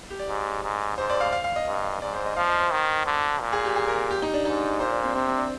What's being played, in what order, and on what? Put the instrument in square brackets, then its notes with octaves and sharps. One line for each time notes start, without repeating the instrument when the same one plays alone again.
[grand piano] G4
D5
[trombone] G#2
G#2
[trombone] G#2 [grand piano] C5
[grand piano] D5
F5
F5
F5
D#5
[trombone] G2
[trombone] G#2 [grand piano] D5
[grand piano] C5
D#5
[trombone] F3 [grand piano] F5
[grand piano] D#5
C5
[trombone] D#3
D3
A#2
[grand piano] G#4
G4
G#4
A#4
G4
D#4
D4
[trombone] G#2 [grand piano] D#4
[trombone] A#2 [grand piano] C5
[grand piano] D4
C4
[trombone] C3 [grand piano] C4
[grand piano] C4
D4